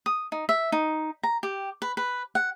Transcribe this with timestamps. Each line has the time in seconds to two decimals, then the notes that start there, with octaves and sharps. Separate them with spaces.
0.06 D#6
0.32 D#4
0.49 E5
0.72 D#4
1.23 A#5
1.43 G4
1.82 B4
1.97 B4
2.35 F#5